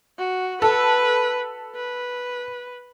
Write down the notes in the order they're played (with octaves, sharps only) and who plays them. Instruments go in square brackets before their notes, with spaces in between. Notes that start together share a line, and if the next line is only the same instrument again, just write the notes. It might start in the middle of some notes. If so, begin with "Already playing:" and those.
[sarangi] F#4
[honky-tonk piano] A4 [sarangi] B4
[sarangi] B4